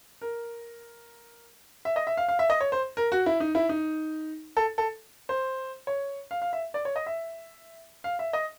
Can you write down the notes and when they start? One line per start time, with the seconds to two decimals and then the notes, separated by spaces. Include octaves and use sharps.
0.21 A#4
1.85 E5
1.96 D#5
2.07 E5
2.17 F5
2.28 F5
2.39 E5
2.50 D#5
2.61 C#5
2.72 C5
2.97 A#4
3.12 F#4
3.26 E4
3.40 D#4
3.55 E4
3.69 D#4
4.57 A4
4.78 A4
5.29 C5
5.87 C#5
6.31 F5
6.42 F5
6.53 E5
6.74 D5
6.85 C#5
6.96 D#5
7.06 E5
8.04 F5
8.19 E5
8.33 D#5